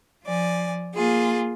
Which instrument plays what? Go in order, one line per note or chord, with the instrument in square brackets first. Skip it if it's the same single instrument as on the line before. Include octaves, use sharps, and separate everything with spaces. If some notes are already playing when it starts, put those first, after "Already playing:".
[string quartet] F3 D5 G#5
A#3 F4 G#4